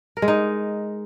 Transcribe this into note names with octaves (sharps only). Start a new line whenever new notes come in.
A#4
G#3
D#4